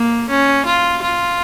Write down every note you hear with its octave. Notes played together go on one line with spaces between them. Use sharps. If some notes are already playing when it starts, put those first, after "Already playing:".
Already playing: A#3
C#4
F4
F4